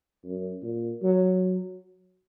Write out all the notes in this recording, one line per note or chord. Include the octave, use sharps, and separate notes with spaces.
F#2
A#2
F#3